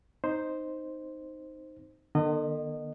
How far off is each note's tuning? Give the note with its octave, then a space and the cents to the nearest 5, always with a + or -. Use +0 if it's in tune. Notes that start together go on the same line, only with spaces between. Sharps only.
C4 +0 D#4 +0 C5 +0
D3 +40 B3 -40 D#5 -20